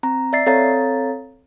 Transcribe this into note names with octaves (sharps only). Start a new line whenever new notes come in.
C4 A#5
D5 E5 A6 C7
C4 A4 C#5 F5 A#5 A6